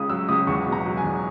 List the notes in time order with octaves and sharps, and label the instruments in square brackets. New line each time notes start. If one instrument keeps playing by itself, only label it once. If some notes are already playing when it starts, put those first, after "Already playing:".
Already playing: [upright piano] C#2 C#3 D#6
F#3 E6
C#2 D#6
E2 C#6
B2
A#5
F#3
G#5
E2